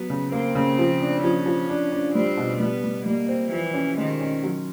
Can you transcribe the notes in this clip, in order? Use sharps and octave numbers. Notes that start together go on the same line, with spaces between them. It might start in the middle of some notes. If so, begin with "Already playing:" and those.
Already playing: F#3 B3
C#3
A#3 C4
C#3
F3
D4
F3 C#4
F3
D4
D4
G3 C4
B2
G3 B3
G3
G3 A#3
C4
E3 F3
C#4
D#3 G#3
C#4
F#3